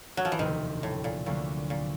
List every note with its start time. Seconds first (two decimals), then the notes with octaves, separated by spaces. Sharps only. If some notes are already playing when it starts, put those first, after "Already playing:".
0.17 F#3
0.25 F3
0.32 E3
0.38 E1 D2 C3 D#3 F3 A#3
0.83 A2
1.04 A#2
1.26 D2 A#2 D3 F#3 A#3
1.70 A#2